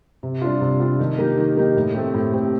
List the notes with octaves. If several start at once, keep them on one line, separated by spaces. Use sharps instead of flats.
C3
G3 D4 F4
C3
G3 D4 F4
D#3
A#3 D#4 G4
D#3
A#3 D#4 G4
A2
A3 C4 G4
A2
A3 C4 G4